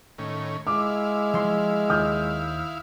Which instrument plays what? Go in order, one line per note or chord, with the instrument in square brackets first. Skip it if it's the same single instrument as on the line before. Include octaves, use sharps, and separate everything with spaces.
[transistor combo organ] A2 D#3 C#4
[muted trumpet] G#3 [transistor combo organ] E4 F5 [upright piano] D6
[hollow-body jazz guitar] F3 C6
[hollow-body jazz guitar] D#2 D#3 [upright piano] D#6 F6 G6